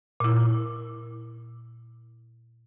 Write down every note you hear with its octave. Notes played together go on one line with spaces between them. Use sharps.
A#2 E4